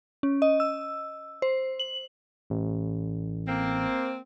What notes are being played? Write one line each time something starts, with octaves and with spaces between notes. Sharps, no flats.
C#4
D#5
E6
C5
F#7
A1
A#3 C4